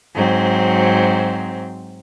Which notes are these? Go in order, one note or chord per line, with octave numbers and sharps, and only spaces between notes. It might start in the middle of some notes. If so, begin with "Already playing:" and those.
G#2 F#3 C4